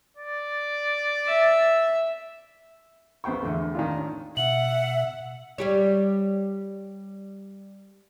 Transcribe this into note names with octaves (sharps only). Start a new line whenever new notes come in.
D5
E5
A#1 B3 C5 G5 C#6
E2 D3 A3
D#3 D4 F4
C#4
B2 E5 F#5 F#7
G3 G4 C#5